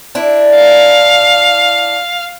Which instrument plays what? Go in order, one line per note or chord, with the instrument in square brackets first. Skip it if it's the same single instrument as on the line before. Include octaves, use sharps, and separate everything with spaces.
[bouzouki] D4 E4
[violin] F5